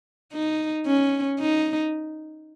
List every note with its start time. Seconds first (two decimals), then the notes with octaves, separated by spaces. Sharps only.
0.33 D#4
0.87 C#4
1.40 D#4